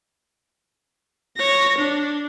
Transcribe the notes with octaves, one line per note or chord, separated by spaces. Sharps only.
C#5 A#6
D4